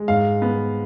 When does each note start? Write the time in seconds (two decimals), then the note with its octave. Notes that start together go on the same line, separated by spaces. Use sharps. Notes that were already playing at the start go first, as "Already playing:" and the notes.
Already playing: G#3
0.08 G#2 F5
0.42 B3